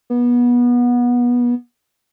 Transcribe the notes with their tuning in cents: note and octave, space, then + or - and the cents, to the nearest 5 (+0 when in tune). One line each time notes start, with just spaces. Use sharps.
B3 -25